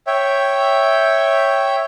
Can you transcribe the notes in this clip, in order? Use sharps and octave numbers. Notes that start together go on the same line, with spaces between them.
C#5 E5 G5